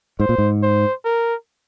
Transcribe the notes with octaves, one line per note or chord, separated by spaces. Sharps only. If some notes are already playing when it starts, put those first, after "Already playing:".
G#2 C5
A#2
G#2
C5
A#4